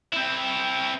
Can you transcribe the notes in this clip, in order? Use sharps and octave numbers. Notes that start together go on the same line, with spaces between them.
C4 E4